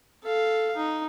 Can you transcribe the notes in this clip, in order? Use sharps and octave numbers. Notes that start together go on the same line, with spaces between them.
A4 F5
D#4